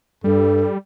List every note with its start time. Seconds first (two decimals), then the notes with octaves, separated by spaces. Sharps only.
0.24 G2 G3 A4